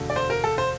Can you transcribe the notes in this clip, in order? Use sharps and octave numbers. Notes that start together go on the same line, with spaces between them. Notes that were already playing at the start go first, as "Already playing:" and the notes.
Already playing: E1 D2 D3 A3
D5
C5
A#4
A4
C5